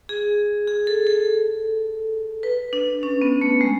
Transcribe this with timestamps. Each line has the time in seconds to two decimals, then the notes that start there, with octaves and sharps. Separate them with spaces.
0.09 G#4
0.67 G#4
0.87 A4
1.07 A4
2.43 B4
2.73 D4
3.03 C#4
3.22 B3
3.41 A3
3.61 G#3